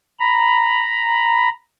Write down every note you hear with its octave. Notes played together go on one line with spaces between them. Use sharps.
A#5 B5